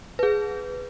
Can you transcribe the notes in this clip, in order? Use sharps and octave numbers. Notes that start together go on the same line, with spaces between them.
G#4 B4